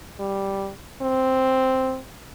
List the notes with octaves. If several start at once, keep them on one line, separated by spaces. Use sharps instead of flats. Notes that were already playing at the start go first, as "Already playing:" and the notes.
G3
C4